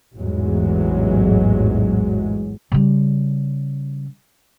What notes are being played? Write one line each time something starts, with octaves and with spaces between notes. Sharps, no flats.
A1 E2 G#2 F#3 G#3
C#3 G3